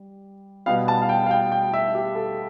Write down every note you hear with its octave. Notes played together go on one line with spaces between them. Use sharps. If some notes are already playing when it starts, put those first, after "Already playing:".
Already playing: G3
B2 G3 B3 F5
A5
F5
G5
F5
G5
G5
E5
G4
A4